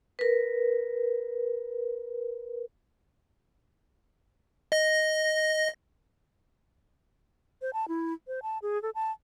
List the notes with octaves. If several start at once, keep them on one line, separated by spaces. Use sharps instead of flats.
A#4 B4
D#5 A#6
C5
A5
E4
C5
A5
G#4
A4
A5